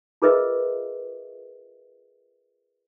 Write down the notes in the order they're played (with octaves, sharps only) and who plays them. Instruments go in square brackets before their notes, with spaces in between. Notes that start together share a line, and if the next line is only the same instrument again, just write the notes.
[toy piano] F4 G#4 A#4 B4 D#5 E5